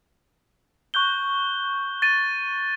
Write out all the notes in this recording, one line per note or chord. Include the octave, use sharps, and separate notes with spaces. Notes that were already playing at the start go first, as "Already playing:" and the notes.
C#6 F#6 G6 G7
A6 D#7